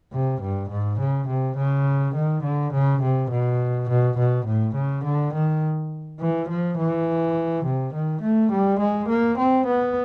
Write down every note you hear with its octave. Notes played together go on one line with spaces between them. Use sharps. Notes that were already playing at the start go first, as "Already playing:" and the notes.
C3
G2
G#2
C#3
C3
C#3
D#3
D3
C#3
C3
B2
B2
B2
A2
C#3
D3
D#3
E3
F3
E3
C3
D#3
A3
G3
G#3
A#3
C4
B3